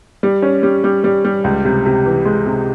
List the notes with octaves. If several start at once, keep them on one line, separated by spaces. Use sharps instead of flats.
G3
C#4
G3
G3
G3
G3
C#2
C3
C3
E3
G#3
C3